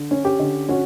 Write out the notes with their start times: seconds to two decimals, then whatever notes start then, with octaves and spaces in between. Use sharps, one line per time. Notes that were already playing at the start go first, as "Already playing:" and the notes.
Already playing: D3
0.11 C#4
0.25 G4
0.39 D3
0.69 C#4 F#4